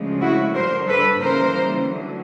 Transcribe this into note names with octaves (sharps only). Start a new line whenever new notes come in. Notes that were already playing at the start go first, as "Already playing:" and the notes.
Already playing: D2 C#3 F3 G#3
E4 F#4
G2 D3 G3 A#4 C5
A4 B4
D#2 C#3 E3 G3 A#4 C5
D2 D3 F#3